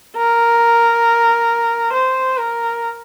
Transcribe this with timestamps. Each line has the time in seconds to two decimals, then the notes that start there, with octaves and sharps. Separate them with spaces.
0.16 A#4
1.93 C5
2.37 A#4